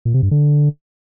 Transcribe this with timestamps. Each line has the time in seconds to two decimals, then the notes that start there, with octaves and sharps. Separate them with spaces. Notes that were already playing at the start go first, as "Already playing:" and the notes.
0.05 A#2
0.14 C3
0.23 G2
0.31 D3